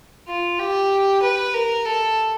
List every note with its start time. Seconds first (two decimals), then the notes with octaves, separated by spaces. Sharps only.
0.28 F4
0.59 G4
1.23 B4
1.54 A#4
1.85 A4